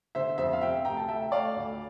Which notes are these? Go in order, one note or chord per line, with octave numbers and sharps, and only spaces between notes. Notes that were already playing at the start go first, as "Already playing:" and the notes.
D3 C5 E5
F2 C5 E5
F5
C3 E5 G5
D2 G5 A#5
A5
A3 E5 G5
A3 D5 F5
D2